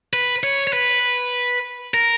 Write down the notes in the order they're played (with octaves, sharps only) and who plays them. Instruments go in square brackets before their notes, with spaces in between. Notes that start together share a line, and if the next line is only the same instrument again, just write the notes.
[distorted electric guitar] B4
C#5
C#5
B4
A#4